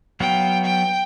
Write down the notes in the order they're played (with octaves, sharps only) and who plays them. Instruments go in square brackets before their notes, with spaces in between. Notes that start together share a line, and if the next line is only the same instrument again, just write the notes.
[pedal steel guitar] F#3 B3 F5 [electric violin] G5
[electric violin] G5